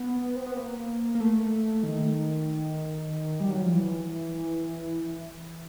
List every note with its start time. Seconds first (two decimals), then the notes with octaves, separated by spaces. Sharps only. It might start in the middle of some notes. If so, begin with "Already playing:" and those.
Already playing: B3
0.36 C4
0.46 B3
0.56 A#3
1.15 A#3
1.20 A3
1.83 D#3
3.40 G3
3.51 F#3
3.62 F3
3.72 E3